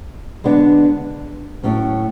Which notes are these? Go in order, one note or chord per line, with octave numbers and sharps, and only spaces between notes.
D3 G#3 B3 D4
A2 F#3 C#4